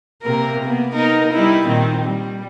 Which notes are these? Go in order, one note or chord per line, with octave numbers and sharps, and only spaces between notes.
C3 A#3 A#4
A#3 B3
B3 D#4 A#4
G3 D#4 E4
A#2 D#3 C4
G3